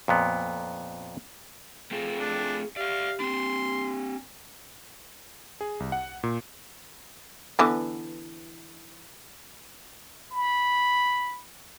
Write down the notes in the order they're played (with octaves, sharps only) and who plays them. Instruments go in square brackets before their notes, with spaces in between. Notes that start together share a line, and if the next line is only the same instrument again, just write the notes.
[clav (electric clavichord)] F2 A#2 B3
[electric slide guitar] A3 C4 F4 [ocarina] G#4
[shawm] D4
[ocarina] G4 [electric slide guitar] D5 E5 [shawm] F5
[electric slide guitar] C4 D4 [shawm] C6
[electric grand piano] G#4
C2
F#5
A#2
[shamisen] D3 E3 B3
[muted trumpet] B5